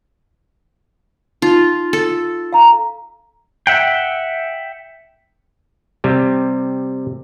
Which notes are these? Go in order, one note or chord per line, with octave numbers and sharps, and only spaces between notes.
D#4 F4
A4
F5 A#5
E5 F#5 G5
C3 G3